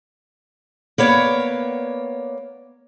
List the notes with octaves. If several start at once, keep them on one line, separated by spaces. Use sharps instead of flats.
A#3 B3 C#5 D5